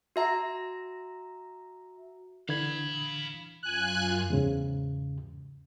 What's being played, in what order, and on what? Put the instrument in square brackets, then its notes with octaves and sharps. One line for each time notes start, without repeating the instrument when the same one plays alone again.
[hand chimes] F#4 E5 A#5
[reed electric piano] D3 G#6 [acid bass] E3 [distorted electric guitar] F5 B5
[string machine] F#2 F4 [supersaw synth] G#5 F#6
[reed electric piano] E2 G#2 C#3